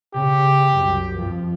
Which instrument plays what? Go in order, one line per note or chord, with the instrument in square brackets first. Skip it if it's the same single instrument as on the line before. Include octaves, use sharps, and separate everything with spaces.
[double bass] C#3 [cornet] G4
[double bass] C2 F#2
F2 F3